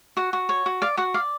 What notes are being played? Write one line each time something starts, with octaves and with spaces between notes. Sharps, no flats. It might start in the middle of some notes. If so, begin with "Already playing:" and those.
F#4 F#5
F#4
C#5
F#4
D5 F5
F#4 F#5
D5 F5